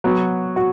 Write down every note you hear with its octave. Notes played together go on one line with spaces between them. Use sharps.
F#3 B3 F#4
F#4